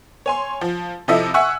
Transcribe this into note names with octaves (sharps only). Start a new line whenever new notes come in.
C#5 G#5 C6
F3
C3 F3 E4 A4 D#5 E5
E5 F#5 G#5 C#6 E6 F#6